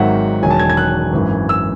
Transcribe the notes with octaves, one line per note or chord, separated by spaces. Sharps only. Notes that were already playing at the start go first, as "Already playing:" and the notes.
Already playing: G#1 G#2 D#3 F#3 E5 F#5
E1 E2 D#3 F#3 G#5
A5
G#6
G#6
F#6
G#1 F#2 E3
E6